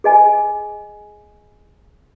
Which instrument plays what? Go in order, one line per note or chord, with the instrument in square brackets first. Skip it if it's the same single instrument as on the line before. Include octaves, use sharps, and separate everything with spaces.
[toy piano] G#4 D#5 G#5